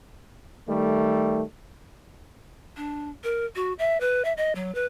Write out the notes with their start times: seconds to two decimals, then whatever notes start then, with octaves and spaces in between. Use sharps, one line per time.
0.68 D#3 G3 A3
2.77 D4
3.24 A#4
3.56 F#4
3.79 E5
4.00 B4
4.25 E5
4.37 D#5
4.55 F#3
4.75 B4